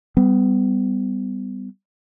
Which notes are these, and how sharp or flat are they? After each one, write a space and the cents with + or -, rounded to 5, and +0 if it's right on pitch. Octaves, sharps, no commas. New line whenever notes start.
G3 +0 B3 +30